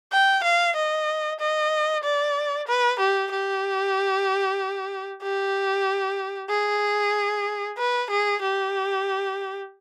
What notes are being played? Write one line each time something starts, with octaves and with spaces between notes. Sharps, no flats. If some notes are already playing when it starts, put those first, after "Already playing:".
G5
F5
D#5
D#5
D5
B4
G4
G4
G4
G#4
B4
G#4
G4